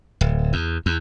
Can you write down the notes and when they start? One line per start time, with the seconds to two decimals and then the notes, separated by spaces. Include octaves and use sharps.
0.21 D1
0.53 E2
0.86 E2